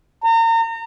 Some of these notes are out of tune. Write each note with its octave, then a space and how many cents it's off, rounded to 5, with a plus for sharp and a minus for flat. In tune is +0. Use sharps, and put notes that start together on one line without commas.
A#5 -35